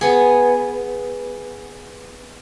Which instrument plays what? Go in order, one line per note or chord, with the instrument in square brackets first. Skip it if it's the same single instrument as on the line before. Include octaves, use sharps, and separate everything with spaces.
[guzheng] B3 G#4